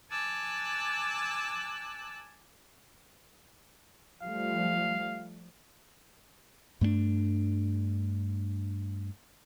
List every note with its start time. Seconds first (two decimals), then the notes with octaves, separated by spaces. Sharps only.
0.10 G#5 A5 D6 E6 F#6
4.22 F3 G3 A3 F5
6.81 G2 A3 B3 D4